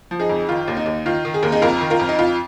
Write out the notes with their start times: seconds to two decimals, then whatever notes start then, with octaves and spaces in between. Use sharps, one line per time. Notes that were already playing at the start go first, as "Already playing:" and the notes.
0.11 F3
0.20 D#4 G#4
0.30 F2
0.49 D#3 F4
0.68 D#2
0.77 D#4
0.86 D#2
1.06 D#3 F4
1.25 D#3
1.34 G#4
1.43 D#2 A#4
1.52 D#4 G#4
1.62 F2 F4 A#4
1.81 D#3
1.90 F4 A#4
2.00 F2
2.09 D#4
2.19 F2 F4